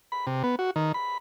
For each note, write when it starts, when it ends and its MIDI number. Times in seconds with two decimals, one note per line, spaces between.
0.12 0.26 83
0.27 0.43 48
0.44 0.56 59
0.59 0.71 66
0.76 0.92 51
0.94 1.18 83